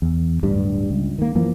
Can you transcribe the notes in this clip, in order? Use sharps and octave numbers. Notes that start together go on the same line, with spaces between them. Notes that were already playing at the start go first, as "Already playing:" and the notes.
E2
D1 G2 G3 D4
C#2
D#3 A#3
F#2 E3 F3 A#3